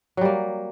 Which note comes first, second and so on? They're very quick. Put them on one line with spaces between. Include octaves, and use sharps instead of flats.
F#3 G3 A#3